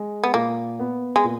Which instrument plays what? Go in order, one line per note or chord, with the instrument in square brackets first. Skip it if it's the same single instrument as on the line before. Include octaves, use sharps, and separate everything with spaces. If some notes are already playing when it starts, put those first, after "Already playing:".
Already playing: [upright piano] G#3
[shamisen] B3
[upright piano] A#2 [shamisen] A#3
[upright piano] B3
[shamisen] G#3
[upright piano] A#2